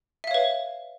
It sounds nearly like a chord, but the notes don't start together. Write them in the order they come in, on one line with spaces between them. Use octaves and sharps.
E5 F5 C#5 B4